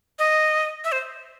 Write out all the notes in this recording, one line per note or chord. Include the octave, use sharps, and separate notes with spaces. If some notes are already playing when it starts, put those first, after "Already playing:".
D#5
E5
C5